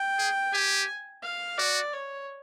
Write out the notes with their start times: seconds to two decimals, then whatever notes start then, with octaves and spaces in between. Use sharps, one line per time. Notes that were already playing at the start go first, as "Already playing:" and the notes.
Already playing: G5
0.19 G#4
0.53 G4 G#5
1.23 F5
1.58 F#4 D5
1.93 C#5